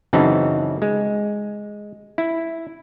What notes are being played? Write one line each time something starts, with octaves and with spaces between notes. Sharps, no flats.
F#2 C#3 E3 C4 D#4 A5
G#3
E4